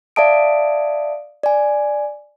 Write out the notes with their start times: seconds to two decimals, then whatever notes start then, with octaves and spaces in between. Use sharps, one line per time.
0.16 D5 E5 F5 A5 D#6 D7
1.43 D5 G#5